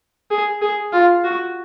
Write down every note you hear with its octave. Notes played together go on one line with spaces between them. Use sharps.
G#4
G#4
F4
F#4